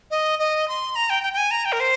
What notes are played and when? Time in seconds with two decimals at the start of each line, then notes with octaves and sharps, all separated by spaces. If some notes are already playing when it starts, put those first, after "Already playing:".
0.11 D#5
0.39 D#5
0.68 C6
0.95 A#5
1.10 G5
1.23 G5
1.33 G5
1.37 G#5
1.51 A#5
1.65 G5
1.72 A#4
1.80 C5